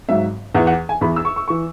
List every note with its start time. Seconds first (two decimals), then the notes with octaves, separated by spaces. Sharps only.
0.08 G#1 G#2 F#3 E5
0.54 E2 F#5
0.59 E3
0.67 F#5
0.89 G#5
1.01 E2 E3 B5
1.16 E6
1.25 C#6
1.36 C#6
1.48 E3 C#6